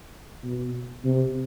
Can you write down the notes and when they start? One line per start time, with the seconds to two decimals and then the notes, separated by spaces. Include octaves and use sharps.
0.44 B2
1.04 C3